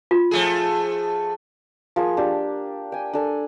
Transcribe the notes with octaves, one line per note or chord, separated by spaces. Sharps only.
F4
F3 A3 G#4
F3 A#3 G#4 C#6
D4 G4
G5 G#5
D4 A4 G#5